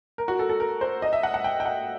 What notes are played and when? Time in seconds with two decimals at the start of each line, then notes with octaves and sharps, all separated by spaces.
0.18 A#4
0.28 F#4
0.39 A4
0.49 A4
0.60 A#4
0.81 C5
1.02 D#5
1.13 E5
1.23 F#5
1.34 F#5
1.44 G5
1.60 G5
1.66 F#5